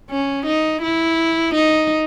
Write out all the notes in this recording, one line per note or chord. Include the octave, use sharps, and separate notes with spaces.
C#4
D#4
E4
D#4